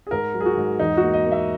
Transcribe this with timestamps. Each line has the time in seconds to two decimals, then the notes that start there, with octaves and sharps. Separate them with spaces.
0.07 G#4
0.11 G#2 A#4
0.34 F#3
0.41 G#4
0.46 F#4
0.57 G#2
0.79 E2 D#4
0.97 F#4
1.03 A#3
1.14 D#5
1.26 A#3
1.32 E5